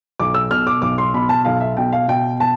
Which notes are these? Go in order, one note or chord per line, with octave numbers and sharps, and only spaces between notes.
B1 D6
E6
B2 F6
D6
B1 D6
C6
B2 B5
A5
B1 F5
E5
B2 G5
F5
B2 G5
A5